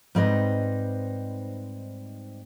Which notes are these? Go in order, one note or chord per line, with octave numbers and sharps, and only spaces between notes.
G#2 G3 C4 D#4 B4 D#5